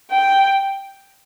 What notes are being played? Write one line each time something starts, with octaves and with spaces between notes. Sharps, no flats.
G5